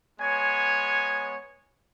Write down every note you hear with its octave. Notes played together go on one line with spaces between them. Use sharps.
G#3 B3 C#5 G#5